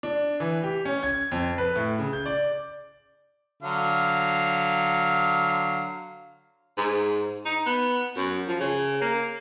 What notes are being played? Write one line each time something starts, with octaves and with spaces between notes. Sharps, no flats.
D4
E3
G4
C#4
G#6
F2
B4
A2
C#3
G6
D5
D3 F#3 F5
G#2
D#4
B3
F#2
F3
C#3
A#3